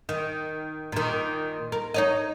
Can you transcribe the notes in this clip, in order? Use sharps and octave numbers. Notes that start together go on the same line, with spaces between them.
D#3
A#2 D#3
A#4
D#4 C#5 D#5